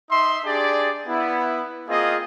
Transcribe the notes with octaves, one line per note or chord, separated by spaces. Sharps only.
D#4 E5 C6
D4 G4 G#4 D5
B3 E4
A#3 C4 F4 G#4 D#5